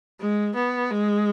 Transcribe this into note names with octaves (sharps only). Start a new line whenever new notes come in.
G#3
B3
G#3